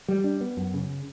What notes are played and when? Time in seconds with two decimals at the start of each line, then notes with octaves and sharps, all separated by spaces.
0.08 G3
0.24 D4
0.41 B3
0.57 F#2
0.74 C#3